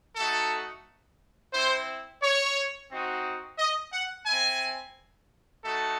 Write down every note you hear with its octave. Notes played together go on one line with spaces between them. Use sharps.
A3 D#4 F#4 A4
C4 E4 C5
C#5
C4 D#4 F#4
D#5
F#5
C4 E4 G#5
A3 D#4 F#4 A4